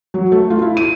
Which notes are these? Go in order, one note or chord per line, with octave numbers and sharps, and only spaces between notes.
F#3
A3
F4
E4
D#7